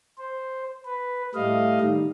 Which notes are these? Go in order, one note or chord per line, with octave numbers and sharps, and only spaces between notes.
C5
B4
A2 G3 A3 D#5 F5
D#3 G3